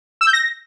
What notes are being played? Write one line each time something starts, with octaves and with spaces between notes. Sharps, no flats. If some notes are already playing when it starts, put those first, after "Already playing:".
E6
G6
A#6